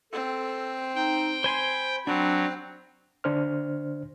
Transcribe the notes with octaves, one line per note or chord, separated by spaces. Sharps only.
C4 A4
D#4 G5
C5 G#5 B5 C6
F#3 C4 D4
D3 D4 C5 F6